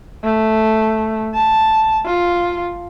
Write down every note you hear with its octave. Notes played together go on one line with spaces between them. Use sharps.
A3
A5
F4